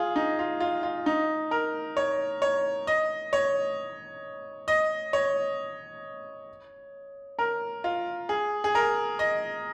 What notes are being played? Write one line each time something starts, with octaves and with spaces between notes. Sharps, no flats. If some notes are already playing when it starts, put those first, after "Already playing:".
Already playing: F4 G#4
D#4
F4
F4
F4
D#4
A#4
C#5
C#5
D#5
C#5
D#5
C#5
A#4
F4
G#4
G#4
A#4
D#5